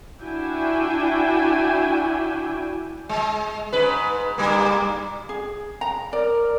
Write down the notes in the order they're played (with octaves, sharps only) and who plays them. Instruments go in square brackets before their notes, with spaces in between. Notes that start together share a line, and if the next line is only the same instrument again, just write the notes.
[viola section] D4 E4 F#4 E5 G5 G#5
[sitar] G#3
G#2 B4
G2 G3 A#3
[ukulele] G#4
A#5
[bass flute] A#4 [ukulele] D5